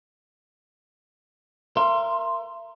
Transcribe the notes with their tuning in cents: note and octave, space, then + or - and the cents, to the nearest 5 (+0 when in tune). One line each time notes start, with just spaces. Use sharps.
A#4 +0 E5 +40 C6 +5